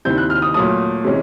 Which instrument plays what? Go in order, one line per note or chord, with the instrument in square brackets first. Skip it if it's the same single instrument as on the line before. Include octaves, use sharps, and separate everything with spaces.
[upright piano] D#2 D#3 G3 C4 E4 G6
F#6
F6
D#6
A#2 F#3 A3 D#6
C3 E3 G#3 C#4